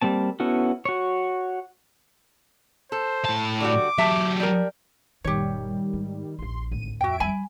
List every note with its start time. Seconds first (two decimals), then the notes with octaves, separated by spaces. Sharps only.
0.02 G3 A#3 C4 A5
0.40 B3 C#4 E4 F#4 A4
0.85 F#4 C#5
2.92 A4 C5
3.25 A2 A5
3.60 D3 G3 F#4 D6
3.98 F#3 G4 E5 A5
4.40 G3 A#4
5.24 F#1 A#2 D#3 G3 G4 C#5
5.93 G#2
6.39 D#1 A#1 C6
6.72 G#1 D2 A2 D#7
7.01 F2 F#4 E5 G5 D7
7.20 F#3 G3 G#5 B5